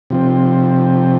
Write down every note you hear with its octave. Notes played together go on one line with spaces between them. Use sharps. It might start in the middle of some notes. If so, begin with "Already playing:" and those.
C3 F3 C4